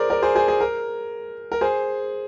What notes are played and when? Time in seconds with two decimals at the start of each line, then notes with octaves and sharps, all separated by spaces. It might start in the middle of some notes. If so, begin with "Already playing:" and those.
Already playing: G#4 A#4 C5 D5
0.10 A#4 D5
0.22 G#4 C5
0.35 G#4 C5
0.48 G#4
0.60 A#4
1.52 A#4
1.61 G#4 C5